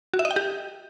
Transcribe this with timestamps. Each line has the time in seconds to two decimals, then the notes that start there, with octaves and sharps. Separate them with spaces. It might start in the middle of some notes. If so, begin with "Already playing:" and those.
0.14 F#4
0.19 E5
0.25 D#5
0.31 G5
0.36 G4